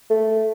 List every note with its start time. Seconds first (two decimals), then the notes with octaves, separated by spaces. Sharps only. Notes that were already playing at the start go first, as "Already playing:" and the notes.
0.10 A3